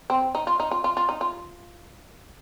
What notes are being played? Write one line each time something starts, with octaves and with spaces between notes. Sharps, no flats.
C4
D#4
F4
D#4
F4
F4
F4
D#4
F4